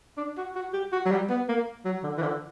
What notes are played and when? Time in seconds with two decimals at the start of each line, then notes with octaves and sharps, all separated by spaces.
0.17 D4
0.37 F#4
0.55 F#4
0.73 G4
0.92 F#4
1.06 F#3
1.11 G3
1.29 B3
1.49 A#3
1.85 F#3
2.03 D3
2.17 E3
2.22 D3